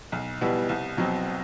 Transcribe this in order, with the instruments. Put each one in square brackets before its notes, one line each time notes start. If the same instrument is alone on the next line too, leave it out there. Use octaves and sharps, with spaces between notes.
[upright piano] B1
B2 G3 B3 E4
C2
B2 F#3 C4